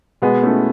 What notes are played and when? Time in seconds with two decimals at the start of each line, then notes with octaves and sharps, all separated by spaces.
0.22 B2 G#3 B3
0.43 A3 C#4 E4 A4